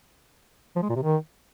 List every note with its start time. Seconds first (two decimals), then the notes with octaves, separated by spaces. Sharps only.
0.76 F3
0.82 G#3
0.89 A#2
0.96 C3
1.02 D#3